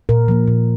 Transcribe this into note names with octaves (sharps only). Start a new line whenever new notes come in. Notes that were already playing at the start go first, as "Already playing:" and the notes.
A#2 A#4
F3 A#3
A#2